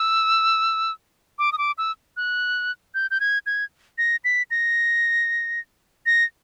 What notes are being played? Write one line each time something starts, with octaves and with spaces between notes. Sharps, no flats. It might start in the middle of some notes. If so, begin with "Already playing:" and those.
Already playing: E6
D6
D#6
D6
E6
F#6
G6
G6
G#6
G#6
A#6
B6
A#6
A#6